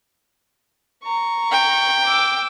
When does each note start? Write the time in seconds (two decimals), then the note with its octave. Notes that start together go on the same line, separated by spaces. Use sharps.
1.04 A#5 C#6
1.52 G5
2.04 D6 E6